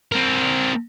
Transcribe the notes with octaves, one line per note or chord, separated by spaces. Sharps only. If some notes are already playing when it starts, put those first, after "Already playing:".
C4 A#4